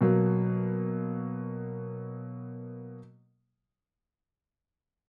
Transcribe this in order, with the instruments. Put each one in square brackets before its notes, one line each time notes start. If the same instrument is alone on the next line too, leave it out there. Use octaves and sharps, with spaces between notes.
[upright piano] B2 F#3 A#3